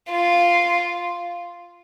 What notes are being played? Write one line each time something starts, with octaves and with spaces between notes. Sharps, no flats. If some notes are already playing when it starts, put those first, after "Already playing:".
F4